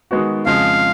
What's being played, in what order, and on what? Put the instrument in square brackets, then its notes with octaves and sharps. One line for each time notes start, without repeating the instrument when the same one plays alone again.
[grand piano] D#3 G#3 B3 F#4
[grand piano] F2 C#3 F3 G#3 [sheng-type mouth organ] F5